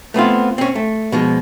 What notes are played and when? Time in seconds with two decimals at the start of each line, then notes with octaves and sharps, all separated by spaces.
0.14 A3 B3 C4 F4
0.58 C4 C#4
0.75 A3
1.12 B2 F3 G#3